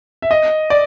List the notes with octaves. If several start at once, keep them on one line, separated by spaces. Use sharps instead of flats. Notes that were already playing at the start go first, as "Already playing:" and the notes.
E5
D#5
D5